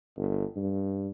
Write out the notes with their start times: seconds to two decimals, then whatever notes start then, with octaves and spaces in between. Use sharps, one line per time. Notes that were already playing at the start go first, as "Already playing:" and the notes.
0.17 G1
0.56 G2